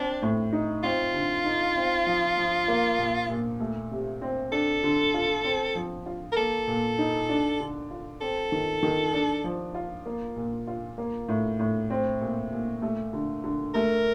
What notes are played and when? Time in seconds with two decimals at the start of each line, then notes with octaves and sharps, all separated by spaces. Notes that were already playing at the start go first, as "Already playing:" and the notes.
Already playing: C4 D4
0.22 A2
0.53 D#4
0.84 C4 F4
1.14 D3
1.45 D#4
1.76 C4
2.06 F3
2.37 F3
2.68 A#3
2.99 A#2
3.29 A#2
3.60 A3
3.91 C3
4.22 C4
4.52 D4 A4
4.83 D3
5.14 F4
5.44 C4
5.75 F3
6.06 F4
6.32 A#4
6.36 A#3 A4
6.67 A#2
6.99 D#4
7.29 D4
7.60 D3
7.91 F4
8.21 C4 A4
8.52 D#3
8.83 D#3
9.13 D4
9.44 F3
9.75 F4
10.06 A#3
10.36 A#2
10.67 F4
10.98 A#3
11.29 A2
11.59 A2
11.90 C4
12.21 A#2
12.52 A#2
12.82 A3
13.13 D3
13.44 D3
13.74 A3 A#4